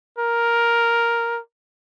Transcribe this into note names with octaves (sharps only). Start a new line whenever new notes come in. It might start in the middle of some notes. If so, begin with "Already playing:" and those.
A#4